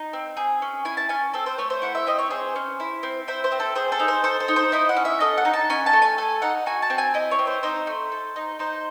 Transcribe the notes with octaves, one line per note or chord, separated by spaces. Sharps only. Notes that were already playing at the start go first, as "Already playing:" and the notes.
Already playing: D#4
C4
G#4
C#4
E4 G#5
A5
C#4 G#5
C4 A4
C5
A3 C#5
C5
E4 F#5
E5
C4 D#5
C#5
G#4 C5
C#4
E4
C4
E4 C5
C5
C4
A4
G#4 C5
A4
D#4
C5
A4 C5
C5
D#4
C5
E4 D#5
F#5
C#4
E5
A4 D#5
F#5
D#4
A5
C#4 G#5
A5
A3
G#5
A4 G#5
D#4 F#5
F#4 G#5
A5
C4
G#5
E4 D#5
C#5
C4
C5
D#4 C5
A3
A4
D#4
D#4 C5